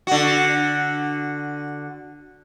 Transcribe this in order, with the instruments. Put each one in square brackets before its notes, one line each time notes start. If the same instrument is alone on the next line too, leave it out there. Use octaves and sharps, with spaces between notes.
[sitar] D3 F#4